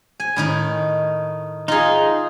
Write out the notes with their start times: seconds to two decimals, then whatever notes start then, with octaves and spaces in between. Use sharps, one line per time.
0.20 G#5
0.36 A2 D#3 D#4
1.68 D#4 F4 G#4